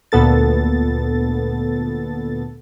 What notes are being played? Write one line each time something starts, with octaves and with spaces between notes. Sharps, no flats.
D2 A#2 B3 A4 A6